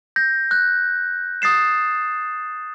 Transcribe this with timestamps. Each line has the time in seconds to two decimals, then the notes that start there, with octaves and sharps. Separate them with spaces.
0.16 G6 A#6
0.51 F#6
1.42 D#6 A6 C7 E7